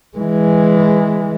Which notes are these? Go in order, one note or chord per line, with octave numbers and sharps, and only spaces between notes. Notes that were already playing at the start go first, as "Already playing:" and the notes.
E3 G#3